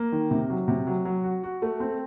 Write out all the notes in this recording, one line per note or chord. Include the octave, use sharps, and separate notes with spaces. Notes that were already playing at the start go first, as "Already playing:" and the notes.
Already playing: A#3
D#3
C3
F#3
C3
F#3
F#3
F#4
F#4
A3
C4